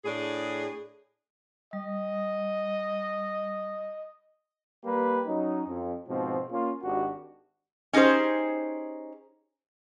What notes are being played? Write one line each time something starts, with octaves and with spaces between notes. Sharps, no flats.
A2 D4 G#4
G3 D#5
G3 A#3 G4 B4
F#3 C#4 D#4
F2
G#2 B2 F3 C4
A#3 C#4 F4
G#1 D4 F#4 G4
C#4 D#4 G4 G#4 C5